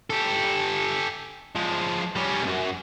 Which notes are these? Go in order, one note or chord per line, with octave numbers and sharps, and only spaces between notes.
G4 A4
F3 G#3
G3 C#4
B1 F#2